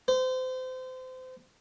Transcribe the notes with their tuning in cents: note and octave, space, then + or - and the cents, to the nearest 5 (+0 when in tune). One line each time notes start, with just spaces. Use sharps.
C5 -30